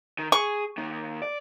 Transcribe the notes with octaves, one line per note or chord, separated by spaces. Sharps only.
D#3
G#4 C#6
D#2 D#3
D5